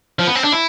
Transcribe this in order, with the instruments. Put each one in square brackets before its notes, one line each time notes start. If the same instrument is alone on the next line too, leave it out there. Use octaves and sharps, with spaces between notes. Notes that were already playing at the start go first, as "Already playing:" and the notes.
[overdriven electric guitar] F3
B3
C4
D4
E4